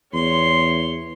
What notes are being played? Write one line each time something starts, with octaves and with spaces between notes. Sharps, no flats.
E2 C#5 C6